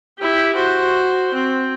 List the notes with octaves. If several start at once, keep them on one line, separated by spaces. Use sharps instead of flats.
E4 G4
F#4 C5
C4